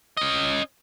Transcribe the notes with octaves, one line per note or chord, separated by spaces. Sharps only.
C#4 D#5